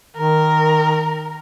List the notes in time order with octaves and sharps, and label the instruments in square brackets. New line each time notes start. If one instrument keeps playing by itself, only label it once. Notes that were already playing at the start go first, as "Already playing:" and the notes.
[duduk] D#3 [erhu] A#4